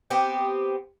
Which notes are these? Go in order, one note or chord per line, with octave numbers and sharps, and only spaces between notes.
B3 C4 G4